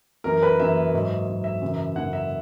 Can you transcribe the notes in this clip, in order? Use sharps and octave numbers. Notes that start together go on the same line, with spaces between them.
F#2 E3 A#4
B4
F#2 E3 E5
G#2 F#3
G#2 F#3
E5
F#2 C#3 E3
F#2 C#3 E3 F#5
E5